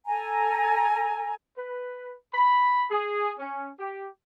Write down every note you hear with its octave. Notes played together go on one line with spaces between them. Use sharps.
A4 G#5 A#5
B4
B5
G#4
C#4
G4